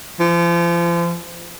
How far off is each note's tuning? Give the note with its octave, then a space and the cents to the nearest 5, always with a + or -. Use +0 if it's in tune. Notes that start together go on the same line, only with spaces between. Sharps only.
F3 -35